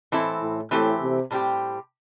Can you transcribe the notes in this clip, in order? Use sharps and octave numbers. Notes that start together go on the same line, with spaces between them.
A2 E3 C4 E4 A4
A2
A2 E3 A3 C4 G4
C3
A2 G3 C4 G4